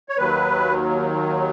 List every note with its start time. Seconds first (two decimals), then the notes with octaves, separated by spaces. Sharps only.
0.09 C#5
0.17 D#2 D#3 F#3 B4